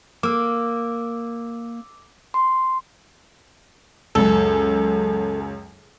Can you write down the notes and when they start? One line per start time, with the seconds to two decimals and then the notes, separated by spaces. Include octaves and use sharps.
0.23 A#3 D6 E6
2.34 C6
4.15 C#2 F#2 A4